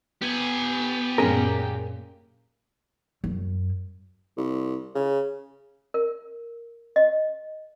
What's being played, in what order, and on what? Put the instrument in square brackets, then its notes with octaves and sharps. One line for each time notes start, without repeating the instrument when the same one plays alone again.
[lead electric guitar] B3 [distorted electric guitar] G4 G#5
[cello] F#2 A#2 [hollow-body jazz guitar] C#4 G#4 A#4
[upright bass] F#2
[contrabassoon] C2
C#3
[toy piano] A#4
D#5